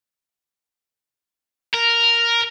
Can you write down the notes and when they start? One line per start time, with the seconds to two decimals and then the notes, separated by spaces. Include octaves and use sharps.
1.74 A#4